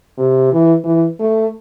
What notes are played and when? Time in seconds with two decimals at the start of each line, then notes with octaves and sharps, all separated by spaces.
0.18 C3
0.52 E3
0.84 E3
1.20 A3